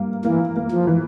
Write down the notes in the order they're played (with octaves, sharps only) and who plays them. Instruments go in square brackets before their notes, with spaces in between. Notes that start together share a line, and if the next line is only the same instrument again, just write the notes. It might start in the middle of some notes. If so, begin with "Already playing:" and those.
Already playing: [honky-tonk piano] G2 A#3
[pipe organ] E3 [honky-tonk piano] A#3
[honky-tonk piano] A#3
[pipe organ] F3
[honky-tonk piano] E3